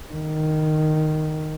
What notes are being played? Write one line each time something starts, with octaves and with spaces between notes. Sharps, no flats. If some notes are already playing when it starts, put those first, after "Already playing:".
D#3